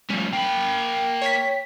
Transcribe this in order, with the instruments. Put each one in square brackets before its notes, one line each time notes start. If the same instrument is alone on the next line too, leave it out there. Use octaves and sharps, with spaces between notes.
[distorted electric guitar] F3 C#4 [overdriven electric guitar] G3 A3
[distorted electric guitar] A#3 B5 [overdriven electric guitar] G5
[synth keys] C#5 B6